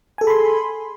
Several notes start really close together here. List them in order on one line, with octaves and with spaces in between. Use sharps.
G#5 A4 G#4 B5 C6